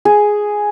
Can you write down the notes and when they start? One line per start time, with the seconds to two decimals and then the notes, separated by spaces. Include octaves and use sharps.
0.05 G#4